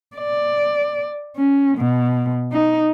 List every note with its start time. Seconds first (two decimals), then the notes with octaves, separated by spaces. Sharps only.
0.17 D5
1.37 C#4
1.78 B2
2.53 D#4